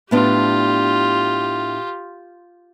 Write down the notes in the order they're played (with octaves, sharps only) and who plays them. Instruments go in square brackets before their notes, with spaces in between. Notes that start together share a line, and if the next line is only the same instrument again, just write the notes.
[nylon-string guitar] A2 B3 D4 [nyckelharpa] F4 G4